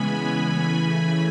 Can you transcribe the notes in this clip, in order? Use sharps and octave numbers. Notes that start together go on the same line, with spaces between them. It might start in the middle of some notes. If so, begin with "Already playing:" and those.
Already playing: C#3 E3 G#3 B3 G#5 B5
C#3 E3 A3